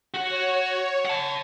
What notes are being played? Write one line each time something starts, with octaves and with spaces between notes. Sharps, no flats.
F#4 C#5 F#5
F#5 A5